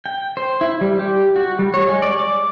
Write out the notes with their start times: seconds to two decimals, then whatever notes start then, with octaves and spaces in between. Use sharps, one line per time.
0.06 G5
0.37 C5
0.61 E4
0.81 G3
0.99 G4
1.36 F#4
1.59 G3
1.74 C#5
1.89 G#3
2.02 D5
2.19 D6